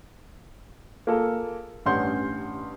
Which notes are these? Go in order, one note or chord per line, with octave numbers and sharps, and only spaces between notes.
A#3 F4 G#4 A4
A1 G2 C#4 F#5 C6 G6